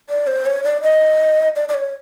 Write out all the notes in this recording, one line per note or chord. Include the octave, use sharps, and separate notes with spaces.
D5
C5
C#5
D5
D#5
D5
D5
C#5